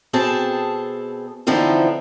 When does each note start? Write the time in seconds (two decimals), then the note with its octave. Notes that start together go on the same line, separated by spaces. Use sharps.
0.13 B2 C4 G#4 A4 A5
1.47 D3 E3 F3 C4 D#4